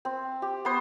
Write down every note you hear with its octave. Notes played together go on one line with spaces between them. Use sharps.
C4
G4
B3 C5